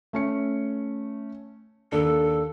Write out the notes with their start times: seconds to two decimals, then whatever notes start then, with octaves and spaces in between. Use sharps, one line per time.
0.13 A3 C#4 C#7
1.92 D#2 D4 A4